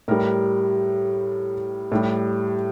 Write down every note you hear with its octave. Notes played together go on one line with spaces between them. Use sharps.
A2 G3 A#4
A2 G3